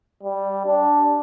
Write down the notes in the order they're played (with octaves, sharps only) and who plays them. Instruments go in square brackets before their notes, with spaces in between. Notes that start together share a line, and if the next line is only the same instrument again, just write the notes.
[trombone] G3
D4